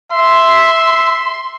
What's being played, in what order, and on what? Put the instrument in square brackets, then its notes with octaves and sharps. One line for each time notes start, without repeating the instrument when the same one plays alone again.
[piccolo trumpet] E5 [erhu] C6